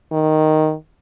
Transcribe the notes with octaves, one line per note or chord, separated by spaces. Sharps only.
D#3